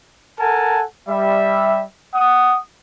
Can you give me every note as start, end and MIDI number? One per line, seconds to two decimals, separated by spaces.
0.40 0.82 69
0.40 0.82 70
0.40 0.82 78
0.40 0.82 80
0.40 0.82 81
1.08 1.83 55
1.08 1.83 76
2.15 2.59 78
2.15 2.59 87